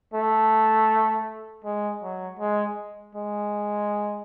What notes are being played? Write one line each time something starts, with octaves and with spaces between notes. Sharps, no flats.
A3
G#3
F#3
G#3
G#3